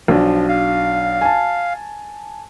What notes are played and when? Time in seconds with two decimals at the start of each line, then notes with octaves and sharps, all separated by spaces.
0.08 B1 F3 D4
0.49 F5
1.21 G#5 A5